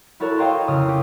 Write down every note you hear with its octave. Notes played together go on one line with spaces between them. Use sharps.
E4 F#4 A4 A#4 C#5
C#5 D#5 F5 G5 A#5 C6
F2 C#3 D#6 F6
F4 G4